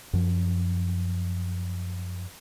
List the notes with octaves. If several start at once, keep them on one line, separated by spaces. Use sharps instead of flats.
F#2 F3